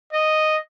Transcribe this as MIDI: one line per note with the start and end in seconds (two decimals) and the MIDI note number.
0.13 0.57 75